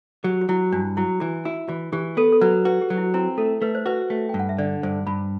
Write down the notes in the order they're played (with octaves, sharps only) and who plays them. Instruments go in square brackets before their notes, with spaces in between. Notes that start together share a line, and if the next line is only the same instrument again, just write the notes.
[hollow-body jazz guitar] F#3 [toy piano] G4
[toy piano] F#4
[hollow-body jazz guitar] F#3 [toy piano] E4
[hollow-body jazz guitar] G2 [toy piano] D4
[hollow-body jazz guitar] F#3 [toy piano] E4
[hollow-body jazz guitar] E3 [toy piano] F#4
[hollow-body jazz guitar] E4 [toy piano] F#4
[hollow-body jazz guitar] E3 [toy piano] F#4
[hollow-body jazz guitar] E3 [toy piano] G4
[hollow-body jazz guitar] B3 [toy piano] A4
[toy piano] A4
[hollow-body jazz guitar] F#3 [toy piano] B4
[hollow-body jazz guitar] F#4 [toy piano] B4
[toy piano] G4
[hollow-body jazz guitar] F#3
[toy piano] E4
[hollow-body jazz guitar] C4 [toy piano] E4
[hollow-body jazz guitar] A3 [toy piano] A4
[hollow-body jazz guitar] A3 [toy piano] B4
[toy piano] C5
[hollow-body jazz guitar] F#4 [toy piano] B4
[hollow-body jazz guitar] A3
[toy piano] G5
[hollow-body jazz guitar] G2
[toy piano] F#5
E5
[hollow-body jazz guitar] D3 [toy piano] D5
[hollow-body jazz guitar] G2 [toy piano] C5
[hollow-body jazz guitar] G2 [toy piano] B5